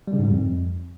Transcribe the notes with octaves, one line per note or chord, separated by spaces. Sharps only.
G3
C#3
G#2
G3
F2